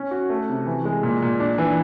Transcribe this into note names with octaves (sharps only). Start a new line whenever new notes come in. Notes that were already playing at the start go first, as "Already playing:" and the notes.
Already playing: C#4
F#4
A3
C3
E3
G#3
A#2
A#2
D4
E3